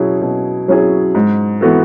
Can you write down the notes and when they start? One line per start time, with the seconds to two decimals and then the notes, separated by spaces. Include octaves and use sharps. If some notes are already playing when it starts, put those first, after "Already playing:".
Already playing: B2 F#3 C#4 E4 G#4
0.21 B2
0.68 F#3 C#4 E4 G#4
1.15 G#2
1.61 E3 B3 F#4 A4